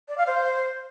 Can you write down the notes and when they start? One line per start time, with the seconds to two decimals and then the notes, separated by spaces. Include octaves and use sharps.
0.08 D5
0.17 F5
0.27 C5